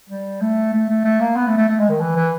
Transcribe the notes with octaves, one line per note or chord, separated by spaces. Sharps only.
G3
A3
A3
A3
A3
A#3
B3
A3
A3
A3
G#3
D#3
E3
E3